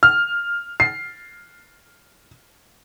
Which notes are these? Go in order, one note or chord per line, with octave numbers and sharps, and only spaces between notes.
F6
C7